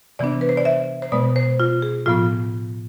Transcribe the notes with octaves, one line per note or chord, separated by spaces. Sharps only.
C3 E3 B3 D4 D5
B4
C5
D5
E5
C5
B2 G#3 B3 D5
C5
F4
G#4
A2 F3 B3 F4